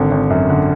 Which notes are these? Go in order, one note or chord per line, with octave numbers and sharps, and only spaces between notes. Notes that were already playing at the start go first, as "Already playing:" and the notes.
Already playing: G#1 D3
G#1
F#2
D3